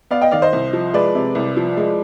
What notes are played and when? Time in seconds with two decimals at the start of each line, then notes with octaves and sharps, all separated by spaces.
0.11 B3 D5 F5
0.21 D#5 G5
0.31 D#3 D5 F5
0.42 C5 D#5
0.53 C2
0.73 F3
0.94 G#3 B4 D5
1.15 C3
1.35 C2
1.57 F3
1.77 G#3